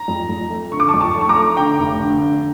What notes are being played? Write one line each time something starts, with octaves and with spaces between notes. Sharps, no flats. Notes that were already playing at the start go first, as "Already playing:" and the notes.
Already playing: A#5
F2
F2
A3
D3 C#6
D6
A5 C#6
F2
A5 C#6
A3
C#6
A#5 D6
A3
D3 G5 A#5
F1
D3
D3